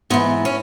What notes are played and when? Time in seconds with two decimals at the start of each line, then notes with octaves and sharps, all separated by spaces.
0.10 G#2 B3
0.13 E3
0.45 C#4